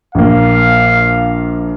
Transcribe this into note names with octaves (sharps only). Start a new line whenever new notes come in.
A#1 A#3 F5